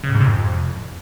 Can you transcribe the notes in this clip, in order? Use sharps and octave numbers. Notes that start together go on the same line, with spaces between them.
C#3
A2
G#2
C3
F2